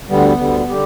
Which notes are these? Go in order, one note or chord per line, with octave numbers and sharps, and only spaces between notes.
D2 D3 G3 B3
D2 D3 G3
D3 G3 G4